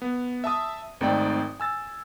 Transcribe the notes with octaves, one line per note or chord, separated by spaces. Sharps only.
B3
E5 A5 D#6
G#1 A3 C4 D#4 D5 G5
G#5 E6 A6